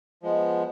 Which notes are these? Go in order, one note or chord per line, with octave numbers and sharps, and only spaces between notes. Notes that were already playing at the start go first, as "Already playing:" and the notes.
F3 G#3 B3